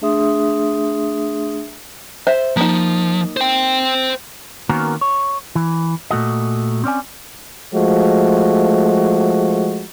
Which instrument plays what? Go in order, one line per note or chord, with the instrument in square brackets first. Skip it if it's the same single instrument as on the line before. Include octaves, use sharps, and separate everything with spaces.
[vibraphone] A3 D4 G#4 E5 C6 D#6
[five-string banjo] C5 E5
[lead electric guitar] F3 [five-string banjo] A#3 D#4
[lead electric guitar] C5 G5
[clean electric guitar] D#3 A#3 B3 C#4 F#4 A#4
C#5
E3
A#2 A3 F#4 D#5
C4 C#4 D5 G#5
[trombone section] F3 G#3 A3 F#4